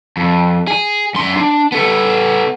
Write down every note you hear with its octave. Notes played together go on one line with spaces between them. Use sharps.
F2
G#4
F#2 C6
D4
B3 A4